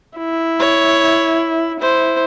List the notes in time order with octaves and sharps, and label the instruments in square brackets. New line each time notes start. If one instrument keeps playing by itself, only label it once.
[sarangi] E4
[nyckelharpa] C#5
[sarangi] E4 [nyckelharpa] C5